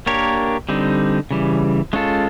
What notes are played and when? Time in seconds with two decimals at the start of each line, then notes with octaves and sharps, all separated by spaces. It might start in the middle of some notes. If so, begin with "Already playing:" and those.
0.06 A#3 D4 G4 A#4 C#5
0.69 D3 G3 C4 D#4
1.31 C#3 E3 G3
1.93 G#3 C#4 F4 A4